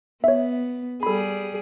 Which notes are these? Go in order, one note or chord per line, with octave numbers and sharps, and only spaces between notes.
B3 C#5 E5
G3 G#4 A4 B5